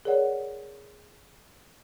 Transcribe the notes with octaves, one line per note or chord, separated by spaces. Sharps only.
G#4 A#4 C#5 D5 F#5